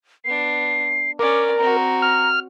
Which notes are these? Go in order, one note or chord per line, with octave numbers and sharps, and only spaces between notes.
B3 D4 C7
C#4 A#4 D5 D6
C4 F#4 A#5
F6